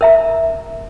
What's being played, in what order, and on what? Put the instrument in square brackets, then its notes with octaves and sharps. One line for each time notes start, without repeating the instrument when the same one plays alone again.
[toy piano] A#4 E5 A#5